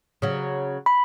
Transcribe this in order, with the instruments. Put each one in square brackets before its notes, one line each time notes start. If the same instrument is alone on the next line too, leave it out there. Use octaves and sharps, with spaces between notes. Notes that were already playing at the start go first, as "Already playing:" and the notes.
[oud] C#3 F#3
[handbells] B5